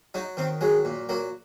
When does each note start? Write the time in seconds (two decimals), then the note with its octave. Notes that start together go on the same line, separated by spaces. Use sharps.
0.14 F#3 D#4
0.37 D#3 C4
0.61 F#3 G#3
0.85 A#2
1.09 F#3 A#3